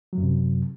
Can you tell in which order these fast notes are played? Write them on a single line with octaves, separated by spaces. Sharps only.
F#3 F#2 C3